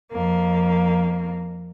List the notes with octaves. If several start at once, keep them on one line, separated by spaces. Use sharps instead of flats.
F2 A#3